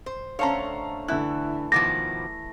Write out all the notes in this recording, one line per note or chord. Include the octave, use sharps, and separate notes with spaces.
C5
D3 A3 C#4 C5 C#5 F5 A5 A#5
D3 E3 A3 E4 F#6
B2 D#3 F3 D6 A#6